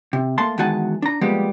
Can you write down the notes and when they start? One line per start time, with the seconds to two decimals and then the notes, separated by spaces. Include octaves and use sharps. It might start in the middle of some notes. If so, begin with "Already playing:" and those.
0.13 C3
0.38 A3 A#3 A5 C6
0.58 E2 D#3 G#3 F#4 G#5 A5
1.02 D4 A#5
1.21 F3 G3 G#3 A#3 B3 G4